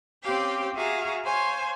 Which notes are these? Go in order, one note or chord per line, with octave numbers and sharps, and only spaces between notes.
C4 C#4 G4 F5 G5
F#4 G#4 E5 F5 G#5 A#5
C5 C#5 F5 G#5